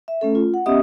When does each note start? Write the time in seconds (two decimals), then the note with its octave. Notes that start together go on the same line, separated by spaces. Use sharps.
0.08 E5
0.21 A3 C#4 A4
0.35 F4
0.54 F#5
0.66 B3 C#4 G4 D#5 E5 D#6